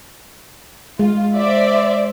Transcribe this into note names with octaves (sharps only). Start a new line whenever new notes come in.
G#3 F4
C5 D5 E5